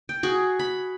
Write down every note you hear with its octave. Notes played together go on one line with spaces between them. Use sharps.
G5
F#4 G#4
B5